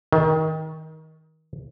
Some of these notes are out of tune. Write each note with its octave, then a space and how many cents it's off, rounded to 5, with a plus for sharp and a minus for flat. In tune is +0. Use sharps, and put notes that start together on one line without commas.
D#3 +25